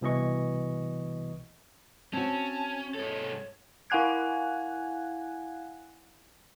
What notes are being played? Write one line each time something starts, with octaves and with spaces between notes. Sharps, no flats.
C2 B2 E3 D#5 C#6
C4 C#4 F#4 A5
G#2 A4 C#5
E4 F5 F#5 G#5 F#6 G#6